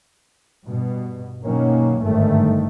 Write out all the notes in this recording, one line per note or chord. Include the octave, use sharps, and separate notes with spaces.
G2 B2
B2 D#3 F#3 A#3 C#4
G1 G#2 D#3 A3